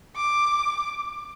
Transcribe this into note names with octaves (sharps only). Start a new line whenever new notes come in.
D6